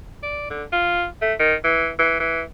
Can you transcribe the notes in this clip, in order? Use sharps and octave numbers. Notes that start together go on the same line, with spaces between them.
D5
D3
F4
A3
D#3
E3
E3
E3